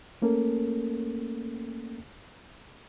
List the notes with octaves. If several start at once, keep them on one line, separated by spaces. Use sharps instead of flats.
A3 A#3 C#4 A4 A#4